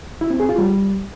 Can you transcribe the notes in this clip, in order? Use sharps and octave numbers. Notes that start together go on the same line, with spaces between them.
E4
C4
G#4
F4
G3